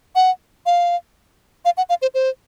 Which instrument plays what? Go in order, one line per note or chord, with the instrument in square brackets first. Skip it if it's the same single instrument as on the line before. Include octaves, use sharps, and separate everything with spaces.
[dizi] F#5
F5
F5
F#5
F5
C5
C5